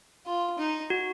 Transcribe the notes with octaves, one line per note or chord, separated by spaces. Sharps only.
F4
D#4
F#4